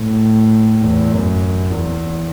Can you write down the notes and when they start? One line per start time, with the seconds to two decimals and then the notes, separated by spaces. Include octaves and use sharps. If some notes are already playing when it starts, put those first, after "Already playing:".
Already playing: A2
0.81 E2
1.11 F#2
1.71 E2